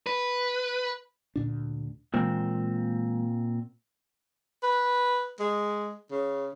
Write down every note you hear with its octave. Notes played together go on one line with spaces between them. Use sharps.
B4
D2 A#2 D4
A#2 E3 G#3 A#3 C4
B4
G#3
C#3